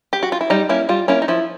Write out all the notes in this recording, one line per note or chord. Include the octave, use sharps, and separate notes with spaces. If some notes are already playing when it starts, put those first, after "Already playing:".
G4
F#4
F4
E4
G3 D#4
A#3 C#4 E4
G3 F4
A#3 C#4 E4
D#4
F3 E4